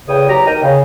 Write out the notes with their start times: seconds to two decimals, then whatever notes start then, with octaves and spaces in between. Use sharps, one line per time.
0.08 E2 A2 C#3 C#5 G5 D#6
0.28 E2 F#3 G4 A#5
0.46 D#2 A#4 D#5 G5
0.63 C#3